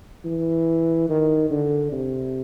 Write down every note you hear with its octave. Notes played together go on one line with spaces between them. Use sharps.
E3
D#3
D3
C3